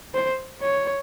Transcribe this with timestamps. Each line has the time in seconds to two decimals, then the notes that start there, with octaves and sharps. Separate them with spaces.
0.14 C5
0.62 C#5